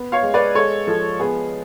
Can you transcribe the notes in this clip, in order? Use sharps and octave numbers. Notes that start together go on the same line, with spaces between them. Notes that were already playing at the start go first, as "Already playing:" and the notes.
Already playing: B3
C#5 F5
G#3
B4 D5
G#3 A4 C#5
F3 A4
B3 G#4